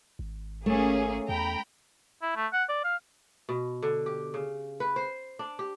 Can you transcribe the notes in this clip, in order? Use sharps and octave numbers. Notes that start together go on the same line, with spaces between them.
G#1
A3 A#3 C#4 G#4
E2 G5 A#5 B5
E4
A3
F#5
D5
F5
B2
D3
G4
C#3
B4
C5
D4
G4